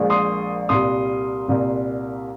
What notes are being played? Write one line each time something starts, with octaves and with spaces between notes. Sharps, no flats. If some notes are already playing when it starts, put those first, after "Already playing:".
Already playing: A#1 A#2 G#3
C6 D#6
C2 A#2 G3 C6 D#6
C2 A#2 G3